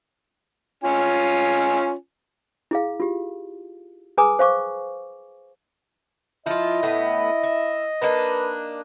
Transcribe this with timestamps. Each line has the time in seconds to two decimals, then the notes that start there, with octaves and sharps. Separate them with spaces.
0.84 C#4 F4 G#5
2.71 E4 G#4 F5
3.00 F4 G4
4.18 G#4 B4 G#5 A#5 D6 D#6
4.39 C5 F5 C#6 D6
6.46 F3 E4 F4 D#5
6.83 A2 B3
7.43 E5
8.02 A#3 D4 D#4 B4